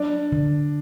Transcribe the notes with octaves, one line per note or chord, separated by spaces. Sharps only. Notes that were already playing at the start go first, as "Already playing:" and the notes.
Already playing: F#3 D4
D3